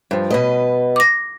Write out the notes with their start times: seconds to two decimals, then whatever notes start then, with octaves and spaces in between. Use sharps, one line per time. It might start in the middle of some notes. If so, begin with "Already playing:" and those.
0.11 G2 F3
0.30 B2 B4 D#5
0.96 D6 A#6